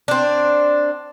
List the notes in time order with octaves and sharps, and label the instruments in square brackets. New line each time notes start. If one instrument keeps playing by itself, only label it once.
[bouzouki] C4 D4